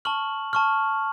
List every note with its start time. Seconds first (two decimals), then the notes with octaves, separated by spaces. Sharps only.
0.05 A5 C#6 F6 F#7
0.53 A5 C#6 F6